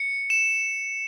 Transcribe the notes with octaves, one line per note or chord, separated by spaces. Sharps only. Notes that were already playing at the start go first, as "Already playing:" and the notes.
Already playing: C#7
E7